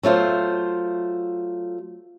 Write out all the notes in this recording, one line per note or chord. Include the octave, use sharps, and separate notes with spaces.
F#3 A3 F4 C5